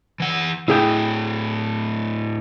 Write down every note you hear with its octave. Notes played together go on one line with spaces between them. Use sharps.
E3 F#5
A2 D3 E4 G#4 G5